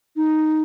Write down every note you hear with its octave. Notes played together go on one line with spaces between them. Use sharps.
D#4